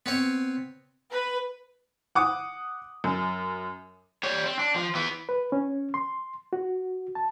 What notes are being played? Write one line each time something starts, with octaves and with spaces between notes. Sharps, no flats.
B3 C4 C#5
B4
F#5 D6 D#6
F#2
G3 C#5
C4
D4
F3
E3 B3
B4
C#4
C6
F#4
A5